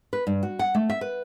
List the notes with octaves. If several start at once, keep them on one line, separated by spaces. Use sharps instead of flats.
B4
G2
F#4
F#5
A3
E5
B4